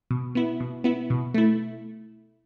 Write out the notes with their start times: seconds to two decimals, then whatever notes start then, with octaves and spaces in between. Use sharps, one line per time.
0.11 B2
0.35 B3 E4
0.60 B2
0.84 B3 E4
1.10 B2
1.34 A3 E4